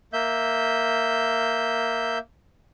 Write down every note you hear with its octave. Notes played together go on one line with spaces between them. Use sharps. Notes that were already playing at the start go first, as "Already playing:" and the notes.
A#3 E5 G6